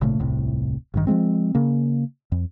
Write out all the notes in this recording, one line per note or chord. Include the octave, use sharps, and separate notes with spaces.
G#1 A#2 C#3 A3
D#1 C2 A2 C3
A1 G2 D#3
F3 F#3 G#3 C4
C#3 A#3
F2